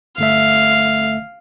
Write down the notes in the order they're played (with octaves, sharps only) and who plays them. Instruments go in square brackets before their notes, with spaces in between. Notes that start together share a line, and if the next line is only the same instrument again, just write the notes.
[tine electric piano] G1 A3 E5 [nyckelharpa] F5